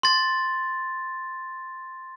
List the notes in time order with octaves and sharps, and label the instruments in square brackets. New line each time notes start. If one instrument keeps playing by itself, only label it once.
[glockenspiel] C6 A6